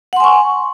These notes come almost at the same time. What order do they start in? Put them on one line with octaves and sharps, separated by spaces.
F#5 C6 G#5 C#6